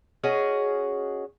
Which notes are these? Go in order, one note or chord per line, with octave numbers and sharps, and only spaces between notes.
C#4 F#4 G#4 D#5